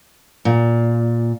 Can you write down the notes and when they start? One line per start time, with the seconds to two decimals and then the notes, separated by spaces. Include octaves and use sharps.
0.45 A#2